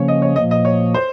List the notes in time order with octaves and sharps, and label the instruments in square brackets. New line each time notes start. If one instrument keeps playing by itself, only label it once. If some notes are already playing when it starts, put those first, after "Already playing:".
Already playing: [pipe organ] C#3 F3 A#3 C#4 [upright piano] C#5
[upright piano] D#5
C#5
[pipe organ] A#2 F3 A#3 [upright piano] D#5
[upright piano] D#5
C#5
C5